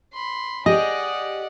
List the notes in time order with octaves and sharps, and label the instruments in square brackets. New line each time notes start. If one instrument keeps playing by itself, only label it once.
[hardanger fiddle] B5 C6
[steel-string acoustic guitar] G4 G#4 [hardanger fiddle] D5 F#5 [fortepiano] D#5